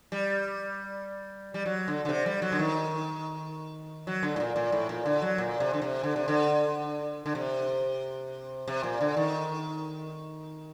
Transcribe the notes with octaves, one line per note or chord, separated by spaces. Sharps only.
G3
G3
F#3
D3
D3
C3
G3
F#3
D3
D#3
F#3
D3
A2
A#2
A#2
A2
A#2
D3
F#3
A#2
C3
D3
C3
D3
C3
D3
D3
C3
C3
A#2
D3
D#3